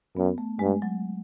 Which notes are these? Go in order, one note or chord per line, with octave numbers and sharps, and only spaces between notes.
F#2 B3
A3
G2 G#3
F#3